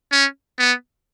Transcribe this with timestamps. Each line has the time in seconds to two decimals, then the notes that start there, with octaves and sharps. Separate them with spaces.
0.12 C#4
0.59 B3